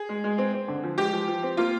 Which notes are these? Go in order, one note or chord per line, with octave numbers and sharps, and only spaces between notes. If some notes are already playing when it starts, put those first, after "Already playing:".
Already playing: G#4
G#3
G#3
C4
C4
D3
F3
G#3 G4
F3
F3
C4
A#3 F4